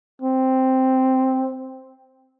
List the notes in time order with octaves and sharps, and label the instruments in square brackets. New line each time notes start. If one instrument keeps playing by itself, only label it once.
[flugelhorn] C4